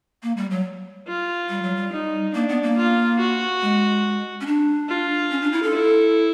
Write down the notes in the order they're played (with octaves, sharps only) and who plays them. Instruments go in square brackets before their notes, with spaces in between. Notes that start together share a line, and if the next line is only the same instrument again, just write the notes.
[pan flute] A#3
G3
F#3
[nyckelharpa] F4
[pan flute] G3
F#3
G3
[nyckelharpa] D#4
[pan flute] A#3 [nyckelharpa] D4
[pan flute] B3
A#3
[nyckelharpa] F4
F#4
[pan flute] G#3
C#4
D4
[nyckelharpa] F4
[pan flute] C#4
D4
E4
A4
[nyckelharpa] E4